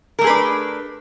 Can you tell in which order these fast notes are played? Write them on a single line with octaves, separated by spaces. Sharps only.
A#4 A3 G#4 B4 D4